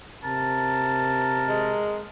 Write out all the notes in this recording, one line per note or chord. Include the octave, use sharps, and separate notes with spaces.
C3 A#4 A5
G#3